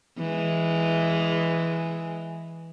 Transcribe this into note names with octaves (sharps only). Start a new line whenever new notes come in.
E3 G#3